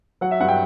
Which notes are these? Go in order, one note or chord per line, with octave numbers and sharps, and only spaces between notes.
F#3 F#5
E5
G2 F#5
G5